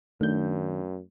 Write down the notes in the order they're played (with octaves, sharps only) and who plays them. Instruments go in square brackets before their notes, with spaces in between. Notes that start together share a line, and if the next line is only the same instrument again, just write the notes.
[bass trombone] F#2 [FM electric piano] D#3 D4 [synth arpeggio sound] A3 G6